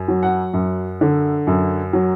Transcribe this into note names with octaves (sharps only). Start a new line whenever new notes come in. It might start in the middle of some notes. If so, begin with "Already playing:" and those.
Already playing: F#2
F#3
F#5
F#2
D3
F#2
F#3